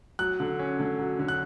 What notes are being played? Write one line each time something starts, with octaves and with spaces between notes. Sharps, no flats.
F#3 F#6
D3
C#4
D3
F#3
D3
F#6